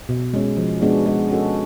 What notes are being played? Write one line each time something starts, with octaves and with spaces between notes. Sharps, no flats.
B2
G#3 C#4
F3
G#3 B3 D4 F#4
G#3
C#4 F#4 A4